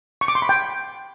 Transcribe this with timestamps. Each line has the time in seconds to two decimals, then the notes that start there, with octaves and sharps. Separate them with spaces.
0.21 C#6
0.28 D6
0.35 C6
0.42 B5
0.49 G5